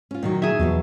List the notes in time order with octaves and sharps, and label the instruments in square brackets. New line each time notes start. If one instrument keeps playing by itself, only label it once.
[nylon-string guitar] C#4 F4
A#2 D#3 F#3
[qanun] G#4 E5
[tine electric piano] E2 [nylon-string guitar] B2 F3 F#3